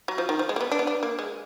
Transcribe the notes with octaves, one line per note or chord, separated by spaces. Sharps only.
F#3
F3
D#3
F3
G#3
A#3
B3
D4
B3
D4
A#3
G#3